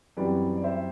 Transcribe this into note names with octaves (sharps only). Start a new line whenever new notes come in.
F#2 E3 G3 C4 B4 D5
D5
C5 E5